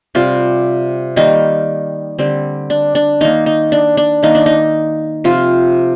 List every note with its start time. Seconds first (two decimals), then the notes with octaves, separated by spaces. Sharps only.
0.15 C3 G3 C4 F4
1.16 D#3 G3 A#3 D#4
2.19 D3 G3 C4
2.70 D4
2.95 D4
3.21 D#3 A#3 D#4
3.46 D#4
3.72 D4
3.97 D4
4.23 D#3 A#3 D#4
4.35 D4
4.46 D#4
5.24 C3 F3 C4 F4